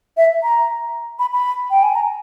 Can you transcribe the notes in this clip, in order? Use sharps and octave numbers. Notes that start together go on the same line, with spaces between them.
E5
A#5
B5
B5
G5
G#5
A#5